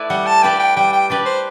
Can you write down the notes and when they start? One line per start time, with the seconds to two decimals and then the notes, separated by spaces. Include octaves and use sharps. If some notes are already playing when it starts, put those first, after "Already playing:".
Already playing: A3 E4 B4 D5
0.10 G3 F#5
0.27 A5
0.43 D4 G4 B4 D5 G5
0.60 G5
0.76 G3 G5
0.93 G5
1.10 D4 G4 B4 D5
1.26 C5